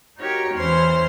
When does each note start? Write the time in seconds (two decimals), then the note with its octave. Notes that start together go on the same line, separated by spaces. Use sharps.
0.17 D#4 F#4 G4 A#4 C#5
0.55 E2 E3 C#4 C5 C6 F6